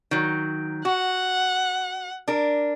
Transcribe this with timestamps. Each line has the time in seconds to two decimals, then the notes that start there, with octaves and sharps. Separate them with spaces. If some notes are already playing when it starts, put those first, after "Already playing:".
0.11 D#3 F#3
0.85 F#4 F#5
2.28 D4 A#4